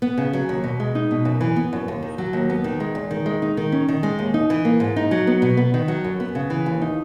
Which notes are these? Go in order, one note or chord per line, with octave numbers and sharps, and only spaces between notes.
B3
C#3
F#3
D#2
B2
G#3
D#4
B2
F#2
E3
B3
F#2
D#2
D#3
F#3
D#2
B3
D#3
G#3
E2
D#3
G#3
D#4
D#3
C#4
D#3
G#3
D#2
D#4
E3
A#3
G#2
D#4
F#3
B3
B2
B3
D#3
F#3
F#2
B3
C#3
E3
D#2
D#4